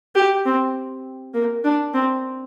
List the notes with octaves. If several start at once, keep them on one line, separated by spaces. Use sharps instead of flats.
G4
C4
A#3
D4
C4